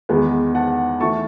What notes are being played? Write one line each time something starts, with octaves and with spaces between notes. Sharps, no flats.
E2 D#3 G#3 B3
F#5 A5
E3 A3 A5 C#6